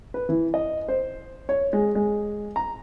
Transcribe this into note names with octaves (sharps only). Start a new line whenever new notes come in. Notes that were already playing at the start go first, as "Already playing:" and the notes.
B4
E3
D#5
C5
C#5
G#3
G#3
A#5